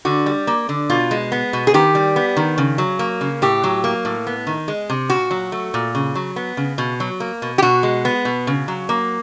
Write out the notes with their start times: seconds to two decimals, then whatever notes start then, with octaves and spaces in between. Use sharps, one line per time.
0.05 D3 F#4
0.26 G3
0.47 A#3
0.69 D3
0.90 B2 F4
1.11 G#3
1.32 B3
1.53 B2
1.67 G#4
1.74 D#3 G4
1.95 G3
2.16 B3
2.37 D#3
2.58 C#3
2.78 F#3
2.99 A#3
3.21 C#3
3.42 A2 G4
3.64 F#3
3.84 A#3
4.05 A2
4.27 B3
4.47 D#3
4.68 G#3
4.90 C3
5.10 A#2 F#4
5.31 F#3
5.52 A3
5.74 A#2
5.95 C#3
6.15 F#3
6.36 B3
6.57 C#3
6.78 B2
7.00 F#3
7.20 A#3
7.42 B2
7.58 G4
7.62 B2 F#4
7.83 G#3
8.05 B3
8.25 B2
8.47 C#3
8.68 F#3
8.89 A#3